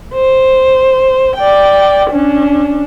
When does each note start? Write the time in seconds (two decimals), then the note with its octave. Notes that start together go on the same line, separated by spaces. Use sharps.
0.14 C5
1.37 D5 G5
2.11 C#4 D4